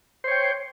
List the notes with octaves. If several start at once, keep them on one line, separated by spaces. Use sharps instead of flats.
C5 C#5 G5